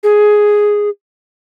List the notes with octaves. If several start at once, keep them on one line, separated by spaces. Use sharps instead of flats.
G#4